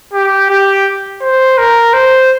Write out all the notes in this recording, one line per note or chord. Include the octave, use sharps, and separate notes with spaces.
G4
G4
C5
A#4
C5